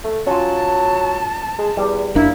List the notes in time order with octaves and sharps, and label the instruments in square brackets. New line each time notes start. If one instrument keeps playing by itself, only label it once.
[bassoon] A3
[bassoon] F#3 [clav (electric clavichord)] C#4 F4 [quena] A5
[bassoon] G#3
[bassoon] E2 [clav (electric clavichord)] G3
[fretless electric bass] F#1 D4 [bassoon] A#3 [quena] E4